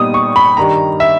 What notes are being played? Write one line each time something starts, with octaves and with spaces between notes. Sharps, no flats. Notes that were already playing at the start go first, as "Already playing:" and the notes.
Already playing: A#2 G3 B3 D#4 D#6
C#6
B5
G2 D#3 G3 A#5
E5